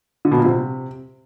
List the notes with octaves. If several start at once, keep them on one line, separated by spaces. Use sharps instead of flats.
D3
B2
A#2
C3